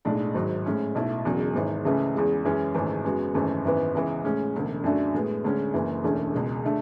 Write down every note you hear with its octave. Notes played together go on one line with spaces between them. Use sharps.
B1 A2 G#3 D4
G#1 G#2 F#3
A2 G#3 C#4 E4
B1 B2 A3 E4
E1 E2 C#3 F#3
G#1 G#2 E3
C#2 C#3 E3 A3 C#4
E2 C#3 G#3
F#2 E3 G#3 C#4
G#1 F#2 C#3 E3 A3
F#2 C#3 G#3 B3 F#4
G#1 F#2 C#3 E3 A3
G#1 F#2 E3 B3
C#2 C#3 E3 B3
A2 G#3 C#4
E1 D2 C#3
F#2 D3 A3 D4 F#4
A2 G#3 B3
D2 D3 G#3 C#4
F#1 F#2 E3
E1 E2 D3 A3 C#4
C#2 B2 G#3
D3 A3